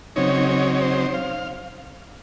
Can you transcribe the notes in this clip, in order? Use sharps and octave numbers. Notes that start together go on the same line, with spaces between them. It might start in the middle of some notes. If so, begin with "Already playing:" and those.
C#3 F#3 C4 D#4 C#5
C#5
C#5
C5
F5